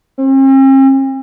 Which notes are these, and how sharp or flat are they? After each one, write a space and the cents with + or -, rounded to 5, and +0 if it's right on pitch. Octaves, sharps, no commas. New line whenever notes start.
C4 +45